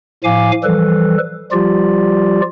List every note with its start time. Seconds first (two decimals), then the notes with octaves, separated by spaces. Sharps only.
0.24 A2 F3 F5 G#5 D6
0.64 E3 F3 G3 A4 B4
1.52 F3 G3 F4 G4 D5